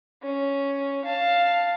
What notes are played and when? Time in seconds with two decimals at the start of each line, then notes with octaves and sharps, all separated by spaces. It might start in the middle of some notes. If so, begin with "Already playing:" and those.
0.22 C#4
1.05 F5 A5